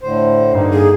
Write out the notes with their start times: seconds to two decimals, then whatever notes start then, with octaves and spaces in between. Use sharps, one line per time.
0.01 A2 D3 C5
0.53 G2 D3 A#3 D#4
0.73 G#4